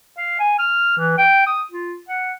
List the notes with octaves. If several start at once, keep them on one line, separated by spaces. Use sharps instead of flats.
F5
G#5
F6
E3
G5
D#6
F4
F#5